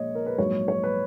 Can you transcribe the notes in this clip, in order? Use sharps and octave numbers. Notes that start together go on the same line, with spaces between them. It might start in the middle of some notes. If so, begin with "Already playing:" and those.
Already playing: A#1 A#2 G#3 C#5 D#5
A#4
B4
A#1 G#2 F#3 C#5
C#5
B4